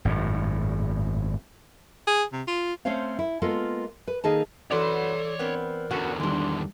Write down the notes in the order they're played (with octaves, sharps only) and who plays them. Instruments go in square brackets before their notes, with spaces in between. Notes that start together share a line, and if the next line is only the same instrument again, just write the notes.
[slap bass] G#1 F#2 A2
[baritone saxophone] G#4
C3
F4
[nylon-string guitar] A3 C4 C#4 C5 C#5 F5
E4
G#3 A#3 B3 F4 A4
B4
D#3 A#3 D#4 G#4 A4 A5
[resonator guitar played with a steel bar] F#2 F#4 B4 [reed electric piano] E3 D5 [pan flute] A4 [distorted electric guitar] C#5 C6
[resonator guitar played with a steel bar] B3 C4 [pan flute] A#4
[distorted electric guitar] E2 D3 [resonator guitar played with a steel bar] B3 C#4 F#4
[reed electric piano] D#3 G3 [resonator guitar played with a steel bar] E3 D4 [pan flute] C6